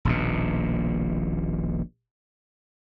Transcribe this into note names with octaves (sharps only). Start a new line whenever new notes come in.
D#1 A#1 B2